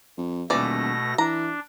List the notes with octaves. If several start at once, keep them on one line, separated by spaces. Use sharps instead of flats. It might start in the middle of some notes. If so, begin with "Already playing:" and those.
F2
D#1 B2 E3 A3 D5 A#6
E3 D4 A#5